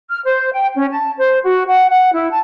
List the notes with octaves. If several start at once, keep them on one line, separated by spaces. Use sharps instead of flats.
F6
C5
G5
C#4
A5
C5
F#4
F#5
F#5
E4
A5